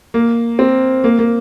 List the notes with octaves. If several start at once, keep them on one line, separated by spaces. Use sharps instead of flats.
A#3
C4
A#3
A#3